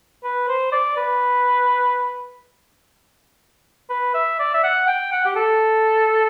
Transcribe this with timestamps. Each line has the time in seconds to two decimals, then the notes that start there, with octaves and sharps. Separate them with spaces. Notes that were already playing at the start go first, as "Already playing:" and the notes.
0.24 B4
0.48 C5
0.72 D5
0.97 B4
3.90 B4
4.14 E5
4.39 D5
4.54 E5
4.64 F#5
4.88 G5
5.12 F#5
5.25 G4
5.36 A4